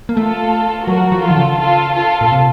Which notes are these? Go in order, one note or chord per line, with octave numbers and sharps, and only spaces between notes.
A#3
A3 F4 A4
F#3 F#4 A#4
F3
F4 A4
D#3
C#3
F4 A4
F4 A4
A#2
C3